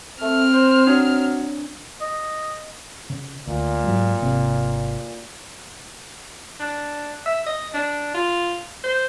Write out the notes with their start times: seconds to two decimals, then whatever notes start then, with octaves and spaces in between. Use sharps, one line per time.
0.21 A3 C4 F6
0.53 C5
0.87 F#3 D4
2.01 D#5
3.10 C#3
3.47 D2 A#2
3.84 G#2 F#3 G#3
4.21 G#1 C3 A#3
6.60 D4
7.26 E5
7.47 D#5
7.74 D4
8.14 F4
8.84 C5